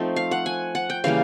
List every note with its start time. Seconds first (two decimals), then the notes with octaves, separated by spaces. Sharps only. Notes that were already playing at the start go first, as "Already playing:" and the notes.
Already playing: F3 A3 C4 D#4
0.16 F5
0.31 F#5
0.46 G#5
0.75 F#5
0.90 G5
1.04 C#3 E3 G3 A#3 F5